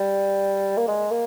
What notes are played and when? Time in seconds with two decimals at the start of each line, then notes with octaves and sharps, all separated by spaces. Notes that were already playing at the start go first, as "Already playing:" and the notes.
Already playing: G3
0.77 A#3
0.88 G#3
1.11 A#3